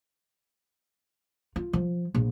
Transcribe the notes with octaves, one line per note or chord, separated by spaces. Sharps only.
F4
F3
A#1